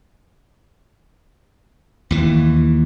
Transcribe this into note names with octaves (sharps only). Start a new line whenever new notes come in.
D#2 E3